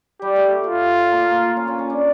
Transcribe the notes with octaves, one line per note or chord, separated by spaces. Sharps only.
G3 G4
A3
F4
A#3
C#4
C#4
C#4
D4